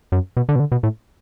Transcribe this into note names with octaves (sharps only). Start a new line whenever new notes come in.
F#2
B2
D3
B2
D3
B2
A2